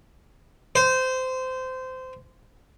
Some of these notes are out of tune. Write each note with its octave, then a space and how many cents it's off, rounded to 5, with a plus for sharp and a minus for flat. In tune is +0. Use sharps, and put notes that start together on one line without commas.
C5 -20